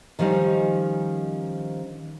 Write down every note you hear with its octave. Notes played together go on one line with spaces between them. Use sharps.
D#3 F3 G3 C#4 D#4